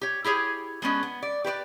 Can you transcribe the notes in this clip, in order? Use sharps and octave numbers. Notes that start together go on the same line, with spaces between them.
G4 C#5
E4 G4 G#4 C#5
G#3 B3 C#4 D4
B3
D5
G4 B4 C5 D5